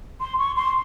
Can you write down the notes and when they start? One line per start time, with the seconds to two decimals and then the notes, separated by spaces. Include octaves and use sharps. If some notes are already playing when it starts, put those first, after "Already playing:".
0.21 C6
0.39 C#6
0.56 C6